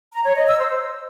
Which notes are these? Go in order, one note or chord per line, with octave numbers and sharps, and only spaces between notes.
A#5
C#5
D#5
E6
C5